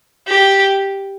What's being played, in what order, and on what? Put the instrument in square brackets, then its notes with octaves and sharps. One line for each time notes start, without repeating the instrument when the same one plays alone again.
[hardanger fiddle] G4